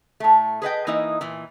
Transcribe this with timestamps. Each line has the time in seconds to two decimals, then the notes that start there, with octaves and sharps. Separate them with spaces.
0.20 A2 A3
0.62 G#4 B4 D#5 G5
0.87 E3 A#3 D#4 E4 D#5
1.21 A#2 E3